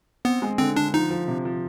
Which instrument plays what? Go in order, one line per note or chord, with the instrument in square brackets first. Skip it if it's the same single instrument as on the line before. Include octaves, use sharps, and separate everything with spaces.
[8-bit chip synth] B3 [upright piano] C4
[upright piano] G#3
[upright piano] D3 [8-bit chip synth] C4
[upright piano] D3 [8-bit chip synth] D4
[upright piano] F3 [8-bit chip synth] D#4
[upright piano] F3
C3
F3